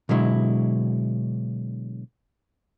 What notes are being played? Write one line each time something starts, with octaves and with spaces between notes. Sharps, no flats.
B2 D3 F#3 G#3 E4